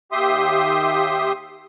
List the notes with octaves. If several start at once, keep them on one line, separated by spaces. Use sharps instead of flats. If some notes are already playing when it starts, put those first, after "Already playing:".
D#2 G4 E5 C6 D#6